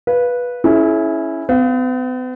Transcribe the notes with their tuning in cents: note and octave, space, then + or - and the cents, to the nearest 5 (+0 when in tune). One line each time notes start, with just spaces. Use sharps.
B4 -10 F5 +0
C#4 +0 E4 -5 G#4 +45
B3 +45 F5 +0